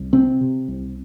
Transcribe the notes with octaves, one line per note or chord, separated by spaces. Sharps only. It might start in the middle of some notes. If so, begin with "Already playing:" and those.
Already playing: C2
C3 C4
C3
C2